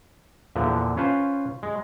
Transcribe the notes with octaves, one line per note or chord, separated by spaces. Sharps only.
E2 A#2 D3 F3
C#4 F4 B4 C5
G#3